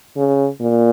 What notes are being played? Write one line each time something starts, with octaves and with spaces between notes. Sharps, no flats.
C#3
A#2